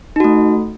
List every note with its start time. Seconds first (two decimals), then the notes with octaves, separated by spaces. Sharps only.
0.16 D#4
0.20 F#4
0.24 A3